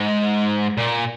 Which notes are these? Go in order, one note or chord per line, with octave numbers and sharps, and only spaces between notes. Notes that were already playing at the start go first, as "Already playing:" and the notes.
Already playing: G#2
A#2